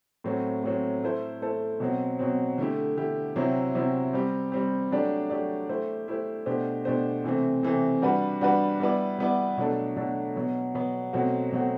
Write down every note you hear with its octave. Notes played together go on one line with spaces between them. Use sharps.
A2 F#3 C4
A2 F#3 C4
A3 E4 A4 C5
A3 E4 A4 C5
B2 F#3 C4
B2 F#3 C4
D3 A3 E4 G4
D3 A3 E4 G4
C3 F#3 C4 E4
C3 F#3 C4 E4
G3 C4 G4
G3 C4 G4
F#3 A3 D4 G4 D5
F#3 A3 D4 G4 D5
A3 E4 G4 C5
A3 E4 G4 C5
B2 A3 D4 G4 C5
B2 A3 D4 G4 C5
C3 E3 A3 C4
C3 E3 A3 C4
G3 D4 F#4 B4
G3 D4 F#4 B4
G3 B3 E4 B4 D5
G3 B3 E4 B4 D5
B2 F#3 A3 D4 A4
B2 F#3 A3 D4 A4
B2 F#3 B3
B2 F#3 B3
B2 F#3 A3 C4 F#4
B2 F#3 A3 C4 F#4